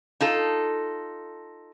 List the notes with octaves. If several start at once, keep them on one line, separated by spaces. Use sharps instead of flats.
D#4 F4 A4